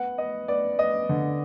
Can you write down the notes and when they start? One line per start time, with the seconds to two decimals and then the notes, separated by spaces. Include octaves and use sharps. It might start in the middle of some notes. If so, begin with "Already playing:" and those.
Already playing: B3 F#5
0.18 B3 D#5
0.48 B3 D5
0.78 B3 D#5
1.09 D3